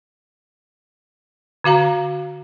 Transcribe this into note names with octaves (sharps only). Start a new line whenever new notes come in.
D3 F#4 F5 A#5